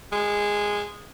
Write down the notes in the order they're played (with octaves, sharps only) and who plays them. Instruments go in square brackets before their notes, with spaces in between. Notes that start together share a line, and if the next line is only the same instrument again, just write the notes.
[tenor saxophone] G#3